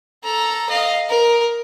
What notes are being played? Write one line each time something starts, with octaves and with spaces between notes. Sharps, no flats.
A4 A#5
D#5 F5
A#4